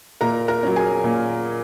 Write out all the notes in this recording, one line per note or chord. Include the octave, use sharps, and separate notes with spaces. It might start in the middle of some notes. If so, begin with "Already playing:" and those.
A#2 A#4 A#5
A#4 A#5
F#3 C#4
G#4 G#5
A#2